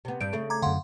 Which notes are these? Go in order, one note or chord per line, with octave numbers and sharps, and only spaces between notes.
C3 B3
G2 G3 G6 D7
C#3 A3
A#5 D6 G#6
F#2 D3 F5 F#5 C6